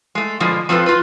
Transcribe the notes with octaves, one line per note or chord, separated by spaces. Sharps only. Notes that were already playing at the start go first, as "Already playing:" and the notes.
G#3 A3
B2 D3 F3 G#3
F3 C4 F4 A4 B4
F4 B4